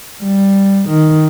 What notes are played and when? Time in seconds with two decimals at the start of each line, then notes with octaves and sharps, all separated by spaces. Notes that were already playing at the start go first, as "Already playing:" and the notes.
0.23 G3
0.89 D#3